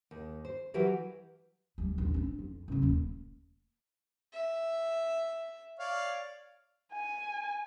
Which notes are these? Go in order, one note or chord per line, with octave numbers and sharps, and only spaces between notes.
D#2
C5
E3 F#3 E4 F#4 G4 A#4
D2 G3
A#1 D#2
C4 D4
F2
A1 C#3
D#1 A#3
E5
C#5 D5 F5
G#5